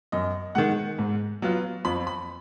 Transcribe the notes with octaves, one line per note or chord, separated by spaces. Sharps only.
F#2 D#5
D#3 G#3 F#5
G#2
F#3 B3 F4
F2 B5
B5